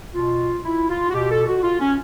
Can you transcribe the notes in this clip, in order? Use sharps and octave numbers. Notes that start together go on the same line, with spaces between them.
B2 F4
E4
F4
F#4
B2 G4
A4
F#4
F4
C#4